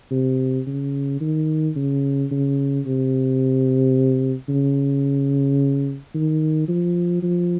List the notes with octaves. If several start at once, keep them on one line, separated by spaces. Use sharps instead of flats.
C3
C#3
D#3
C#3
C#3
C3
C#3
D#3
F3
F3